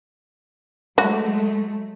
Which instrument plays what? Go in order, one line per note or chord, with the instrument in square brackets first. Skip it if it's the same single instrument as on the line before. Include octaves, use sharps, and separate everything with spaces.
[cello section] F#3 G#3 A3 [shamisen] F#4